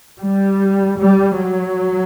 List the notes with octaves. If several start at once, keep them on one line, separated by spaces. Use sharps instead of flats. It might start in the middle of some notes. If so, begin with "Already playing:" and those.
G3
G3
F#3